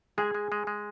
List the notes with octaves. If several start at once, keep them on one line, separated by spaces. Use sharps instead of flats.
G#3 G#4 G#5
G#3
G#3
G#3